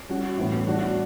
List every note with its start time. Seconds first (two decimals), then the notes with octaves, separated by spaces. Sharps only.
0.09 G3 C#4 F#4
0.37 A2 E3 B3
0.66 G3 D4 F#4